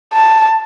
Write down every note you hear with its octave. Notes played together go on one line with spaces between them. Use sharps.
A5